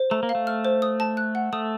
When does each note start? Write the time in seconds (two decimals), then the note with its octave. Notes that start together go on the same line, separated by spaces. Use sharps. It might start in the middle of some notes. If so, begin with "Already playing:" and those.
Already playing: C5
0.11 A3 A#5
0.23 A#3
0.29 F5
0.35 A3
0.47 F6
0.65 C5
0.82 D#6
1.00 A5
1.17 F#6
1.35 F#5
1.53 A3 D#6